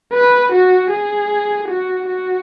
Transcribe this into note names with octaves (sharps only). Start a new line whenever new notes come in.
B4
F#4
G#4
F#4
F#4